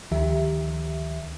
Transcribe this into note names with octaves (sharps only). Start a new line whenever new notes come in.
D2 D#3 F3 G4 E5